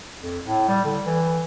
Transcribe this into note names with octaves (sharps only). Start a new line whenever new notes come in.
F2
A2
G3
D3
E3